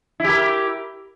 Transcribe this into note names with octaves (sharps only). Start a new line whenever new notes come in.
E4 G4 A#4